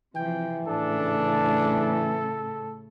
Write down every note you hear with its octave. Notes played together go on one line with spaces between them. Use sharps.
C3 E3 F3 G5
A2 C#3 D4 A4